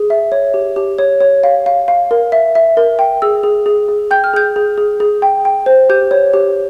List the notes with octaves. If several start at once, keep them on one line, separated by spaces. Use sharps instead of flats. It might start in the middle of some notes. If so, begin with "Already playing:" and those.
Already playing: G#4
E5
C#5
G4
G4
C#5
C#5
F5
F5
F5
A#4
E5
E5
A#4
G5
G#4 E6
G#4
G#4
G#4
G5 G6
F6
G#4 G6
G#4
G#4
G#4
G5
G5
C5
G4 G6
C#5
G4